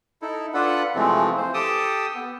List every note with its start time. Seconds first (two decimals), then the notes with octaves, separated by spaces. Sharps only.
0.22 D#4 E4 A4
0.54 D4 F4 A4 B4 F#5
0.95 C3 E3 F3 G#3 A3 C4
1.38 E3 C5
1.54 G4 A4 G5 A5 D#6
2.15 B3